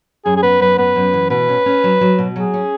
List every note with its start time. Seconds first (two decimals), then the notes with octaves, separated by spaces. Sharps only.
0.25 F#2 G#4
0.36 G#4
0.42 B3 B4
0.60 F#2 B4
0.78 B3 B4
0.96 F#2
1.14 E3
1.30 B2 B4
1.49 C#4
1.66 C#4
1.84 F#3
2.01 F#3
2.19 B2
2.36 F#3 G#4
2.54 C#4